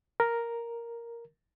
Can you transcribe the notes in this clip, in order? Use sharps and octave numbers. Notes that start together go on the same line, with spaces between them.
A#4